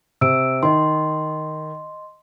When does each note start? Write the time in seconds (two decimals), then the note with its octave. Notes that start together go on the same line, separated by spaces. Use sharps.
0.21 C3 E6 D7
0.63 D#3 D#5 C6